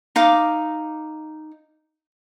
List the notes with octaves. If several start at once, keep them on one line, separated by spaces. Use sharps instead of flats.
D#4 F5 D6